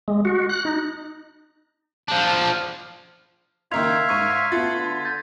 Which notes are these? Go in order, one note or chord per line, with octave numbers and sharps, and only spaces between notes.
G#3
F#4
F#6
D#4
F3 D4
D#3 A#3 D#4 E5 F5 C6 G#6 F7
G#2 C#6 G#6 D#7
C6 G#6 B6
A3 B3 F4 F#5 B5 A6
D3
G6 A6